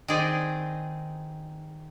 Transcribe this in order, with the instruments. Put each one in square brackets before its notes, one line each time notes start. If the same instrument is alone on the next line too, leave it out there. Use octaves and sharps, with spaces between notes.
[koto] D#3 C4 D#4 G#4 D5